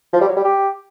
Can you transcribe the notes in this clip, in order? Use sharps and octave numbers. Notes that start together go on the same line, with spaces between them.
F3
G3
F#3
G3
G4